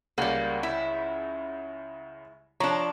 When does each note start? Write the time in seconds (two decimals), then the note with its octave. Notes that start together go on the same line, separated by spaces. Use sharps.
0.18 C#2 C#3 G3 A#3 F#5
0.63 E4
2.60 F3 D4 C#5 A#5 C#6